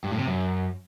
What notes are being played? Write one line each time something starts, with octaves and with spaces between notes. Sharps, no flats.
G2
A2
C3
F#2